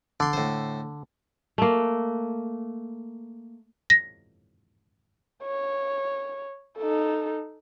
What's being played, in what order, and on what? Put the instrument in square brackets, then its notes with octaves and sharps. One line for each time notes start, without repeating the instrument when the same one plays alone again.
[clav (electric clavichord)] D3 [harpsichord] D5 C6
[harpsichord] A2 C5
[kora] A3 A#3
[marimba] A#6
[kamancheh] C#5
D#4 A4